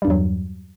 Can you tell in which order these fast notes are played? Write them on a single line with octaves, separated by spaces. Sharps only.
G3 G2 E2 F#3